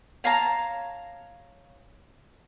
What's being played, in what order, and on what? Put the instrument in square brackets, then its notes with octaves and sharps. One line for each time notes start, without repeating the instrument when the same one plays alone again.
[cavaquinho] C#5 F5 A5 A#5